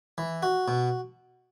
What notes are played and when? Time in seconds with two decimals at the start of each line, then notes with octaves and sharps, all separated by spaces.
0.18 E3
0.43 F#4
0.68 B2